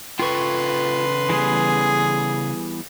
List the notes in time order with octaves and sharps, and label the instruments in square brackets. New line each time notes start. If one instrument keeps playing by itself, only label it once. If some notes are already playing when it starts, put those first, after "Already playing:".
[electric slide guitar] C#3 A4 G5 [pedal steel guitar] F4 C#6 [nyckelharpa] B4 C6
[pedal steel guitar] E3 G3 B3 [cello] G#4